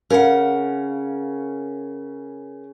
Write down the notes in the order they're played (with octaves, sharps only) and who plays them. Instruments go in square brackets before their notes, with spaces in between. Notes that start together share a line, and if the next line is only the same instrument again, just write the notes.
[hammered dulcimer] C#3 [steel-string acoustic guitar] A#4 F#5